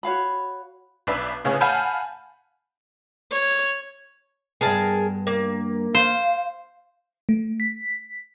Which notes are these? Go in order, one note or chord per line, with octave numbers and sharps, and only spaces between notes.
F#4 C#5 F5 B5
B1 D4 B4 E5
A2 C#3 B3 G#4 C#5
F5 F#5 G#5 A5 B5 G6
C#5
G2 B3 G#4 A#4 A5
A#3
C5 F5
A3
B6